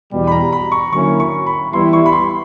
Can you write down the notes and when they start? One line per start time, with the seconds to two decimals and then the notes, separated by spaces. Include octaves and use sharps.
0.12 E2 B2 G3
0.27 B5
0.32 A#5
0.53 B5
0.72 C#6
0.92 D3 F#3 A#3 C#4 E4 C#6
1.20 C#6
1.47 B5
1.73 E3 G3 B3 E4 C6
1.93 C#6
2.06 B5
2.13 C6